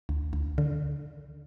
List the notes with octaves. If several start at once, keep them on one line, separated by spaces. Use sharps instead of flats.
D2
D2
D3